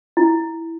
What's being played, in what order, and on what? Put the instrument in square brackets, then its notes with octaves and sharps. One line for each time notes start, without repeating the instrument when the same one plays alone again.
[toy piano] E4